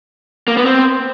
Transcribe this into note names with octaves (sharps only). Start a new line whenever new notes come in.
A#3
B3
C4